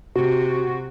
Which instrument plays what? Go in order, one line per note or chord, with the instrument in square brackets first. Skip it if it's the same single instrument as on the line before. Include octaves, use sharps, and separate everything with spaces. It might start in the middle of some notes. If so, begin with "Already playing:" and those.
[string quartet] C3 [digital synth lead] F#4